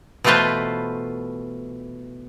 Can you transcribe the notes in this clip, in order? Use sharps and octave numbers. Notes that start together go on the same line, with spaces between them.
B2 E3 A3 F4 B4 C5